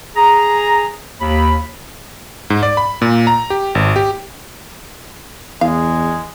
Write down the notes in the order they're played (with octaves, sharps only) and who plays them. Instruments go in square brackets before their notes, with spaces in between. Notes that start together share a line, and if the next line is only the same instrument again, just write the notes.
[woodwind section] G#4 A#5
D#2 B5
[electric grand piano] G#2
D5
B5
A#2
A#5
G4
G#1
G4
[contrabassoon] E2 [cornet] G#3 [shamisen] F5